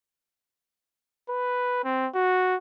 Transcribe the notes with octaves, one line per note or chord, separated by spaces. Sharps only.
B4
C4
F#4